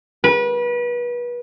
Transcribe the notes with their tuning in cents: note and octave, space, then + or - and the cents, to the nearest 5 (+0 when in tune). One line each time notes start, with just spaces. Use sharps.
B4 -30